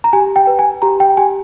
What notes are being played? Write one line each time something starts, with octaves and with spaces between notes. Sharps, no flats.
A#5
G4 G#5
G5
B4
G#5
G4 A#5
G5
G4 G#5